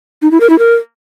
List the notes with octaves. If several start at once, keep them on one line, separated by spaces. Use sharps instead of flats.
D#4
E4
A#4
E4
A#4